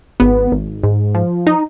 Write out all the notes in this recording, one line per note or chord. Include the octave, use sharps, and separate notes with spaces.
G#1 B3
G#1
G#2
F3
D#4